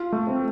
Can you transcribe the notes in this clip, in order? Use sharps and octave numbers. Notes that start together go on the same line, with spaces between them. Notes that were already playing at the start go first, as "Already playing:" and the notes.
Already playing: F4
A3
C4